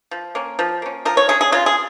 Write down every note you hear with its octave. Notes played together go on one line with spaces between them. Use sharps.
F3
A#3 C#4
F3
A#3 C#4
F3 A#4
C#5
C#4 G#4
G#4
C#3 F4
G#4